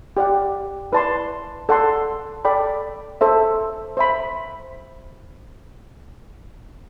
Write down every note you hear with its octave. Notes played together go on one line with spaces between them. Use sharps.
G4 D5 F#5
E4 B4 D5 A5 C6
A4 D5 F#5 A5 C6
A4 D5 G5 B5
A4 C5 E5
C5 E5 B5